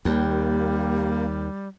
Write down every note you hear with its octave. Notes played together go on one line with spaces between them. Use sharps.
D#2 G3 A#3 G4